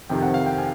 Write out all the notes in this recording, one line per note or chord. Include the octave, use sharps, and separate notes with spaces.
F2 C3 D#3 G5
F#5
F5
G5
G#5